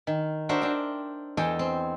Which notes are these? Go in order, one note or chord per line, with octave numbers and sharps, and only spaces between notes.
D#3
D4 F#4 A#4 C5 E5
D4 G5
E2 A4 D#5 G5 G#5
C4